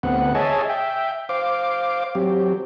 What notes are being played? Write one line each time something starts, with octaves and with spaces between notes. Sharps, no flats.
D2 B3 C4 F#5
G#4 C#5 D#5 E5 G#5 A5
E5 G5
C5 F5 D6
F#3 C4 G4